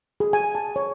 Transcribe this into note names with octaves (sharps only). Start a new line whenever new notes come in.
G#4
G#5
A5
C#5